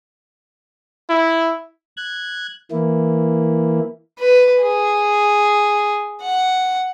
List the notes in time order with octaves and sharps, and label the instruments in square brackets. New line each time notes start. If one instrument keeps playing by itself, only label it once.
[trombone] E4
[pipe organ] F#6 G#6
E3 A#3 E4
[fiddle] B4
G#4
F#5